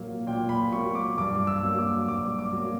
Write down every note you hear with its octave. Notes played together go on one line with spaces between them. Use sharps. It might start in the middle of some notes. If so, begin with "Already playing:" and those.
Already playing: A#2 F#3 A#3
A#2 G5
B5
F#3 A#3 C#6
D6
G2 D6
E6
F#3 A#3
D6
G2 D6
D6
F#3 A#3